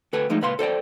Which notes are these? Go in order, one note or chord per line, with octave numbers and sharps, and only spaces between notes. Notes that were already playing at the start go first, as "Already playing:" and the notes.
D2 A4 B4 G5 G#5
F3 G#3 A3 D#4
C#2 A#2 B4 F5 C6
A4 C5 D5 G5